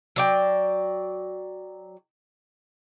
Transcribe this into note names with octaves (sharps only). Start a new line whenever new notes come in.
F#3 D5 G5